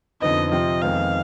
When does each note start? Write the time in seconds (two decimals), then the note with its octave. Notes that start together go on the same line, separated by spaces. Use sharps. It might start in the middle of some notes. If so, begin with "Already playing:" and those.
0.21 F2 D3 F3 B3 D#4 D#5
0.52 C3 F3 C4 F4 D#5
0.82 F2 D#3 G#3 B3 D#4 F5